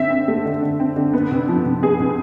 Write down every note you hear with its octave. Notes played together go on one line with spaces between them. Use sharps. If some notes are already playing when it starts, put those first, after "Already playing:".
Already playing: D3 C4 E5
C4
A3
D3
D3
C4
D3
B3
C3
F3
C3
B3 G#4
C3